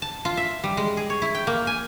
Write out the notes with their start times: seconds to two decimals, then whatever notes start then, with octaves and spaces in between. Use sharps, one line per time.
0.02 A5
0.25 F4
0.37 E5
0.64 G3
0.77 G#3
0.97 G#4
1.10 C#5
1.22 E4
1.35 G5
1.47 A#3
1.67 G#5